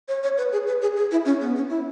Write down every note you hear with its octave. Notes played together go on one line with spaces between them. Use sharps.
C#5
C#5
B4
G#4
B4
G#4
G#4
E4
C#4
B3
C#4
E4